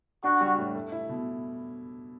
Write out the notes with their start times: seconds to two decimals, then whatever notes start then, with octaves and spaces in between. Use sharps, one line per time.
0.23 D4 F#4
0.41 G3
0.58 A2
0.75 A3
0.92 E4
1.09 B2